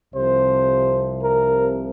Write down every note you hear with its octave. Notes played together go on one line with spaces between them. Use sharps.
C2 C3 F3 C5
A#4